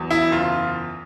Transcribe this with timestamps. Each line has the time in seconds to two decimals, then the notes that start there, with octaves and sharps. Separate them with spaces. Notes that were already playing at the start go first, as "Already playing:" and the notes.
Already playing: E2 F#3
0.10 E4
0.31 F#1 F4